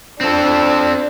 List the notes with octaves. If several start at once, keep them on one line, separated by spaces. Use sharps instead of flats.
C4 D4 A4